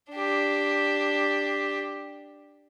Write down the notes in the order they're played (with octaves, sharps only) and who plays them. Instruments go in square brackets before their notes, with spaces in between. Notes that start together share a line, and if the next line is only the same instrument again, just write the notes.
[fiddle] D4 G4